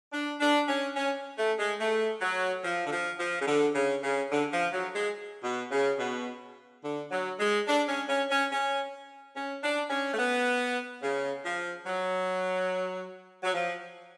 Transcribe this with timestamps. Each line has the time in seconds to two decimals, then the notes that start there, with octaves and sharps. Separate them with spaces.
0.12 D4
0.40 D4
0.68 C#4
0.96 C#4
1.37 A3
1.59 G#3
1.80 A3
2.21 F#3
2.63 F3
2.86 D3
2.91 F3
3.19 F3
3.41 C#3
3.47 D3
3.75 C#3
4.03 C#3
4.31 D3
4.52 F3
4.73 F#3
4.94 G#3
5.43 B2
5.71 C#3
5.99 B2
6.83 D3
7.11 F#3
7.39 G#3
7.67 D4
7.88 C#4
8.08 C#4
8.30 C#4
8.51 C#4
9.35 C#4
9.62 D4
9.90 C#4
10.14 A3
10.18 B3
11.02 C#3
11.44 F3
11.86 F#3
13.43 F#3
13.54 F3